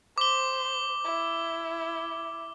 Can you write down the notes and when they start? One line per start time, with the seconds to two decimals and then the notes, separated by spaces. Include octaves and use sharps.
0.18 C5 D6 G7
1.05 E4